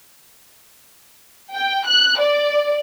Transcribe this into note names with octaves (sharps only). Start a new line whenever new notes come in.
G5
F#6
D5